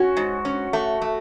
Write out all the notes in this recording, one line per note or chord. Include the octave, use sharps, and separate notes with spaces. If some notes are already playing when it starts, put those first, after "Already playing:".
Already playing: C#4 F#4
G#2
C#4
A3
A3